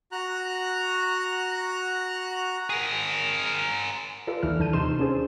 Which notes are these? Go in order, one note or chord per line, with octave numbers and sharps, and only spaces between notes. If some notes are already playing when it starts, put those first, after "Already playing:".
F#4 A#5 F#6
G#4 A#4
F4 A4 B4 D5
D#2 E3 F6
D#2 E3 A5 G6 D#7
C3 D#4 A4 C6 E7
C#4 D4 G#4 A4 C5